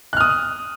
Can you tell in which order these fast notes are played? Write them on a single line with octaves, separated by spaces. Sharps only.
F#6 F6 D#6